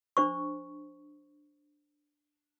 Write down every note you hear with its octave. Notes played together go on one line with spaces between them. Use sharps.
D4 C5 C#6